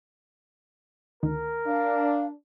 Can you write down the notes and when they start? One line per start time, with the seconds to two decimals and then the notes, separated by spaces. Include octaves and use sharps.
1.23 D2 D#3 A#4
1.67 D4 F5